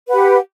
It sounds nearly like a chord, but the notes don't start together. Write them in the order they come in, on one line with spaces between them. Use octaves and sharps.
B4 F#5 G4